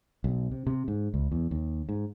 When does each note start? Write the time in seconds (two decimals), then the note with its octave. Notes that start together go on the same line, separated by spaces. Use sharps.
0.24 B1
0.52 C3
0.67 C3
0.88 G#2
1.14 C#2
1.32 E2
1.51 D#2
1.89 G#2